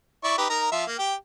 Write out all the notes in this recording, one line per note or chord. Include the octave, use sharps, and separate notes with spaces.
E4 D5 C#6
D#4 G4 B4
D#4 A#4 A#5
F3 E5 F5
A#3
G4 G5